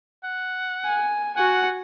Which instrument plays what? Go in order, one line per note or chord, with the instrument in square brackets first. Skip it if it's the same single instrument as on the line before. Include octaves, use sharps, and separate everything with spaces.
[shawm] F#5
[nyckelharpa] G#5
[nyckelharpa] F#4 G#5 [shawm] F#5